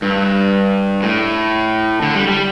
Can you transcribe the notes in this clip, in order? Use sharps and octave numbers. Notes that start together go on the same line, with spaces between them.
G2
A2
D3
G3
G3